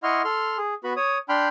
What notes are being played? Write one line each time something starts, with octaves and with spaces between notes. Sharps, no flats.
E4 D#5 F#5 C6 C#6 F6
A4 C6 F6
G#4
B3 F#4 B4 B5
C#5 D#6
D4 G5 B5 C6 F6 G6